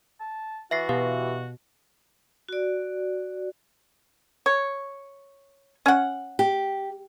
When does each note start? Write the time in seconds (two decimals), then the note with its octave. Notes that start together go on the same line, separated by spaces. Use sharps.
0.20 A5
0.71 E3 F#4 E5 A#6 C7
0.89 B2 G4 F5
2.49 F#4 D5
4.46 C#5
5.86 C#4 F#5
6.39 G4